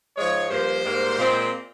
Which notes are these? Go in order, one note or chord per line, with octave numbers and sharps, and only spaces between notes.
G#2 F3 G#3 C#5
G2 F3 A#3 C5
G#2 G3 A#3
A#2 G#3 C4